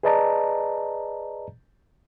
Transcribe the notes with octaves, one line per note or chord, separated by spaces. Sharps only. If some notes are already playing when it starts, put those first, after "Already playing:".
G#4 B4 D5 D#5 A5 A#5